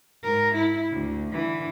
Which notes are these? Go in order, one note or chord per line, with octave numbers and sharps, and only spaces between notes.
G#2 A#4
E4
D2
D3 E3